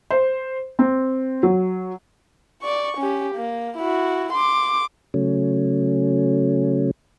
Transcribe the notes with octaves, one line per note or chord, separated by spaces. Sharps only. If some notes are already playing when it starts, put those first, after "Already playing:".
C5
C4
F#3
D5 C#6
C#4 G4
A#3
E4 F#4
C6 D6
C#3 F#3 A3 C#4